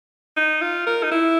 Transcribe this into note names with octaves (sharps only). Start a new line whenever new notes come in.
D#4
F4
A#4
D#4
E4